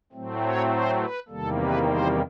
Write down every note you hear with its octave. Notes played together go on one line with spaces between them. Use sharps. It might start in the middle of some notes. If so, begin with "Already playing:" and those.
A2 F#3 A3 C4
C#5
C5
B4
E2 C3 D#3 G3 A#3 A4
B4
C5